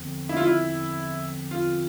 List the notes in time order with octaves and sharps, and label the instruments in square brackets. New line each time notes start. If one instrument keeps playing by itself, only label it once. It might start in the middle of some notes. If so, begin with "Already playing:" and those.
Already playing: [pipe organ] E2 D3 F3 C4
[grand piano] E4
F4
E4
F4